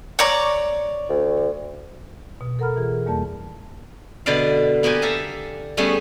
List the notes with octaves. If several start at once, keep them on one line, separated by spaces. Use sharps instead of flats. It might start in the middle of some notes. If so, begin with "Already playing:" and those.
C#5 D5 A#5
D2
B2
A4 A#4 F#5 A#5 B5 F6
E3 F4 G#4
E2 G3 A#3 D5 A5
B2 D3 B4 D5 F5
A#3 B3 F#4 G4 G#5
A4 E5 F5 A#5
G3 A3 B3 C#4 G#4 C#5